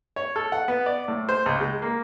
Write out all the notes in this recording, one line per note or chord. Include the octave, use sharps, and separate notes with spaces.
C#5
A4
F#5
B3
D5
A2
C5
C#2
G#3
A#3